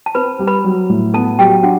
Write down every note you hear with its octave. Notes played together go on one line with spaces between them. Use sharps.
A5
C4 B4 B5
G3
B4 B5
F#3
A2
B3 A4 A5
F#3 G4 G5
D4 F#4 F#5